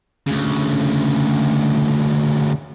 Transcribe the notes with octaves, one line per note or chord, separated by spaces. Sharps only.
D2 C#3